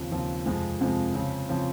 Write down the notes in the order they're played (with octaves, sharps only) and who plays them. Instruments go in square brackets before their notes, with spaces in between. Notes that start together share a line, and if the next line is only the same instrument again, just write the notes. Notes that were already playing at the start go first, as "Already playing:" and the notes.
Already playing: [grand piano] D#2 C#3 F3 C4
D#2 C#3 F3 C4
F2 C3 F3 G#3
F2 C3 F3 G#3
C#3 F3 C4
C#3 F3 C4